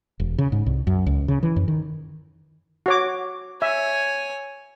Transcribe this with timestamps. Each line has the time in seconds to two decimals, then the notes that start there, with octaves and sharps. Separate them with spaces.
0.20 E1
0.38 C#3
0.52 G#2
0.66 C2
0.87 F#2
1.06 C#2
1.28 C#3
1.43 E3
1.56 F#2
1.68 D#3
2.86 F#4 C#5 D6
3.62 C#5 E5 G#5